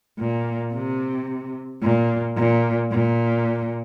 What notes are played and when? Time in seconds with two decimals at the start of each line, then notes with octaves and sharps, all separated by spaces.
0.19 A#2
0.74 C3
1.82 A#2
2.37 A#2
2.91 A#2